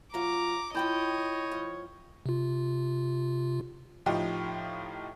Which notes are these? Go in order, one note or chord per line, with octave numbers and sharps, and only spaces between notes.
F#3 F4 A#5 D6
E4 F4 C#5 D#5 G5 A5 B5 G6
F3
C3 F4
A2 F3 D#4 F4 G4